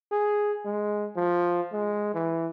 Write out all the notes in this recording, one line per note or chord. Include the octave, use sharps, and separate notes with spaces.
G#4
G#3
F3
G#3
E3